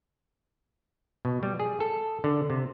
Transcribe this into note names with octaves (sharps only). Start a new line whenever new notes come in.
B2
G3
G#4
A4
D3
C3